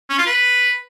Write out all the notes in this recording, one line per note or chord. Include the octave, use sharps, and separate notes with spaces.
C#4
F4
B4